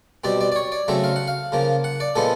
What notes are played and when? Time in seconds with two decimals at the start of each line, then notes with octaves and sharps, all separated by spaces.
0.24 B2 G3 C4 D5
0.41 D5
0.52 D5
0.56 C#5
0.72 D5
0.88 C#3 F#3 A3 C4 E5
1.04 F5
1.16 F#5
1.28 F5
1.52 C#3 F3 A#3
1.84 F#5
2.00 D5
2.15 A#2 F3 G#3 B3 A4